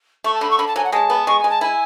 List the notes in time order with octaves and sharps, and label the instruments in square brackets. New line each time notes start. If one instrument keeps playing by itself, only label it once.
[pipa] A3 [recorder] C#6
[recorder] A5
[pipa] D3 [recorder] B5
[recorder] C#6
[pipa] D3 [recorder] B5
[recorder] A5
[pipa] F#3 [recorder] G#5
[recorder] F#5
[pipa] G#3 [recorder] A5
[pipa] B3
[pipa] G#3 [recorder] C#6
[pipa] G#3 [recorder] G#5
[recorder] A5
[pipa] E4 [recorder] G#5